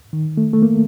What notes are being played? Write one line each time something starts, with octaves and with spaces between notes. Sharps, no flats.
D#3
A3
A3
A#3